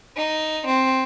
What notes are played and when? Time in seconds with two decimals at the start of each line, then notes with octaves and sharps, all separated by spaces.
0.16 D#4
0.66 C4